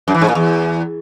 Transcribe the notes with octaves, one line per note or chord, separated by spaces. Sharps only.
F#2
E3
G#2
A#2
E2